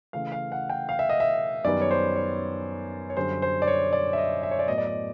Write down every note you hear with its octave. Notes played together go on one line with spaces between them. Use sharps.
C#3 E3 A3 F5
F5
F#5
G5
F5
E5
D#5
E5
F#2 D#3 G3 B3 D5
C#5
C5
C#5
C#5
F#2 D3 G3 C5
C5
D5
C#5
D5
E5
D#5
E5
C#5
D5
A2 F#3 B3 D#5
D5
D#5